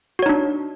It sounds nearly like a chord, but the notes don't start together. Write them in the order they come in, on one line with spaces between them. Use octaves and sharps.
F#4 C#5 D#4 D4